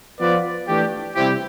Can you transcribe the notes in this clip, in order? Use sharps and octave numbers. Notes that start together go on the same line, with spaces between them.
F3 B3 F4 B4 D5
E3 A3 D4 G4
C3 G3 C4 E4 G4